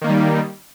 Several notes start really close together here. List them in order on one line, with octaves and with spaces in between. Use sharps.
D#3 A#3 D#4 G3